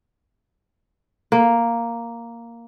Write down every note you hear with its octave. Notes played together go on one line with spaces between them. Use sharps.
A#3